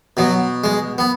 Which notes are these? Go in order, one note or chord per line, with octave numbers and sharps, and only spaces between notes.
B2 F#3
G#3
B3